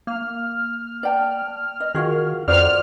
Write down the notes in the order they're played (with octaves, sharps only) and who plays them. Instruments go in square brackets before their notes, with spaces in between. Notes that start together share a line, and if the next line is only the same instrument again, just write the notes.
[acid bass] A#3 [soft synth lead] F6
[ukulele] D5 G5 A5
D#5
[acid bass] D#3 [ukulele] F4 F#4 G#4
[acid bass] F2 [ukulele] F4 F#4 C5 [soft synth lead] D5 [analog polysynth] F6